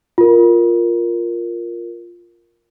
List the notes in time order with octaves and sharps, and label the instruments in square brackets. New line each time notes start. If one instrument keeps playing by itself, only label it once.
[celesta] F4 A#4